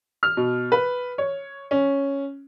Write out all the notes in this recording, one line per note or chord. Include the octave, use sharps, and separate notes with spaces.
F6
B2
B4
C#5
C#4